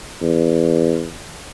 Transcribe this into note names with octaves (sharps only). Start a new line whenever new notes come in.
E2